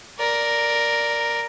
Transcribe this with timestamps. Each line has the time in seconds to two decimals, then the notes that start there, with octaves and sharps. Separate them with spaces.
0.19 A#4 D5